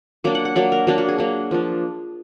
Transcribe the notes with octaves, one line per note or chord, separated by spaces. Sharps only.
F#3 A#3 D4 D6
F#5
F#5
F#3 A#3 D4 D5
A#4
F#3 A#3 D4
F#4
G#4
F#3 A#3 D4
F3 A#3 D4